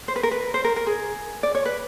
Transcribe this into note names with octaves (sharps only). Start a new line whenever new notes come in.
C5
B4
A#4
B4
C5
A#4
A#4
G#4
D5
C#5
B4